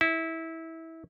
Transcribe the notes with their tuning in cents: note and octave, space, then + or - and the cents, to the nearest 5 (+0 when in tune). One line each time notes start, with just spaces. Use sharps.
E4 -20